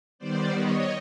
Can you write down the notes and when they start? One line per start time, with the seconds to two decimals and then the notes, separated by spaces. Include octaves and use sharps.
0.19 D#3 G3 B3 C5 D5
0.56 C#5 D#5